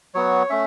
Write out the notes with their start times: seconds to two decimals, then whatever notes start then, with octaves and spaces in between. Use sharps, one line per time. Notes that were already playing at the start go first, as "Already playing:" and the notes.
0.14 F#3 B3 F#4 C#5
0.50 A3 C#4 E5